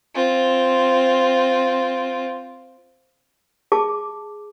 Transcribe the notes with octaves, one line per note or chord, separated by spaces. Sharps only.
C4 F4
G#4 A5 D6